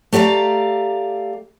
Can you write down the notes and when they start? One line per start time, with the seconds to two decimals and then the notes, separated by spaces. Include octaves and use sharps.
0.13 A3 G4 D5 F5 A#5